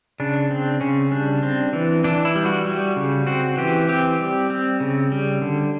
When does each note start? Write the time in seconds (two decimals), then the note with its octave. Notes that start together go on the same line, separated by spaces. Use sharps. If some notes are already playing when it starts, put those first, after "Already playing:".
0.20 C#3 D4
0.51 C4
0.81 C#3 C#4
1.11 G3 D4
1.43 C4
1.73 E3
2.04 E3 D4
2.25 E4
2.35 G3
2.45 F#4
2.65 G3
2.96 C#3
3.26 C4 F#4
3.57 E3 G4
3.89 C4 G4
4.20 G3
4.50 C4
4.80 C#3
5.12 G3
5.42 D3